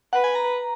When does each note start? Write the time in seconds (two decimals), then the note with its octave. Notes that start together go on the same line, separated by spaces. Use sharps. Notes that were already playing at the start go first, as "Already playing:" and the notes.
0.13 B4 F#5
0.24 G#5
0.35 A#5